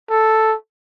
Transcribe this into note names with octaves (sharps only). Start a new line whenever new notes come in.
A4